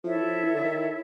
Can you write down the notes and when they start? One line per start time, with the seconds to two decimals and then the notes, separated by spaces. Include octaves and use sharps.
0.03 F3 E4 A4 C#5 E5
0.17 E3
0.23 F3
0.44 E3
0.55 D3
0.64 D#3